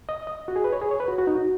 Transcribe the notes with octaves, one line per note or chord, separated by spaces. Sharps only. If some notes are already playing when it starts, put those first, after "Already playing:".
D#5
D#5
F#4
G#4
B4
C#5
G#4
C#5
B4
F#4
F#4
D#4
F#4